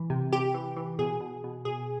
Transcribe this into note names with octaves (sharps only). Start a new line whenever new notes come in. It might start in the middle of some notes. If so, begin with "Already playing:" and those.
Already playing: E3
C3
C3 G4
E3
E3
B2 G#4
B2
B2
B2 G#4